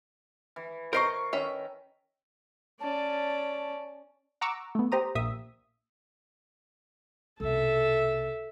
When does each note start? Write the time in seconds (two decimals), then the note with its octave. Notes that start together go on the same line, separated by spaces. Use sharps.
0.56 E3
0.93 A#4 C5 D#5 A#5 C#6 C7 D7
1.33 D#3 C#4 E5
2.80 C#4 D5 A5
4.41 F#5 A#5 C#6 D6 E6
4.75 A3 B3
4.92 G4 C5 A#5 D#6
5.15 A#1 A#2 E5 D#6
7.40 C2 B2 A4 E5